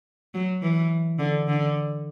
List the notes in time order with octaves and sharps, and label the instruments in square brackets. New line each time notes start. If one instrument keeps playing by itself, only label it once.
[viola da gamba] F#3
E3
D3
D3